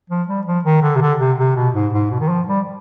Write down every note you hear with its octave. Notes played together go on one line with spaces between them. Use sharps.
F3
G3
F3
D#3
D3
C3
D3
C3
C3
B2
G#2
G#2
B2
D#3
F3
G3